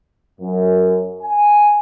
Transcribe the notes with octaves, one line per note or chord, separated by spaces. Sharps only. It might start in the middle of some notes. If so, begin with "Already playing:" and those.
F#2
G#5